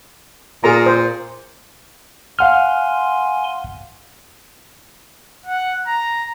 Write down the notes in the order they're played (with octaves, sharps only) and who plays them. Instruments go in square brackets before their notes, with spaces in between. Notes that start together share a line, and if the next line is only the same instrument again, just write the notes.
[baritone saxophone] A#2 [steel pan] G#4 A#4 A#5
[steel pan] C5
[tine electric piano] F5 F#5 F6 [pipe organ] G#5 C6
[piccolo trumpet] F#5
A#5